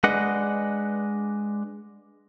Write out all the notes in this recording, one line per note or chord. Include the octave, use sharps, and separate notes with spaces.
G#3 D4 B4 D#5 F#5